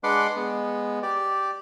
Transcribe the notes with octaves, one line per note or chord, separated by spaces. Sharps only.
G#3 D4 B4 F#5 C6 D6
G#3 B3
G4 D5